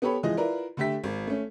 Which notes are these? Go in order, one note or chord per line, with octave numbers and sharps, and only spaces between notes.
B3 G4 A4 C#5 B5
E3 F3 G#3 D#5
E4 F4 A#4 B4 D5
D3 A3 G4 E5 B6
G#1
A3 C#4